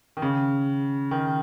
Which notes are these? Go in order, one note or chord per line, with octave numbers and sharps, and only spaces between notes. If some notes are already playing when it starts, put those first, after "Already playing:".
D#3
C#3
D#3